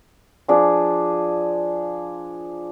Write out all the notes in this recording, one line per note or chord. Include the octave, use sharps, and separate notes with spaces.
F3 D4 G#4